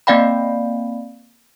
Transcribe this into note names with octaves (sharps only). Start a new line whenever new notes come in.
A#3 C4 D5 F5 G5 B5